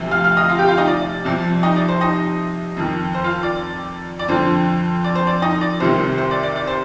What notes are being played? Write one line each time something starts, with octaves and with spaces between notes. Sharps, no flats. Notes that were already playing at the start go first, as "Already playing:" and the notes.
Already playing: D2 C3 F3
F5 F6
F5 F6
D#5 D#6
F4 F5
G4 G5
F4 F5
D#4 D#5
D5
C2 C3 F3
D#4 D#5
D5
C5
D#4 D#5
F2 D#3
C5
F4 F5
D5
D5
F2 D3 F3 C5
D5
C5
D5
D#4 D#5
D5
C2 C3 D#3 C5
C5
D5
D5
D5
C5